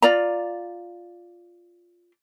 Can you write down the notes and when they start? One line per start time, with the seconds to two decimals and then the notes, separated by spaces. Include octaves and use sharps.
0.02 F4 D5 A#5